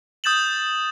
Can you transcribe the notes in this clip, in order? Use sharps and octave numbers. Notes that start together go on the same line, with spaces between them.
D#6 G6 A6 E7 F#7